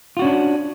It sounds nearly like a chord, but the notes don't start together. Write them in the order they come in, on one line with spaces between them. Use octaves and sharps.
F4 F#4 C#4 D4